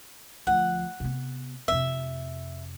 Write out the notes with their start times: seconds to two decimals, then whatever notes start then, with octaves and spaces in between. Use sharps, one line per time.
0.47 D2 F3 F#5
1.00 C3 B3
1.68 F2 C3 E5